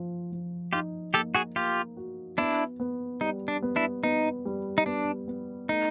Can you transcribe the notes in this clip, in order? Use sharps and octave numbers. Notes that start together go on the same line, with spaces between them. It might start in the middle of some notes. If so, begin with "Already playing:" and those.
Already playing: F3
F3
D#4 F4 G4
A#3 G4 A4
F#4 G#4
A#3 F4 G4
F#4
B3 D4 E4
B3
G3 D#4
D4
B3
D4 E4
B3 D#4
G3
D#4
B3 D4
B3
A3 D#4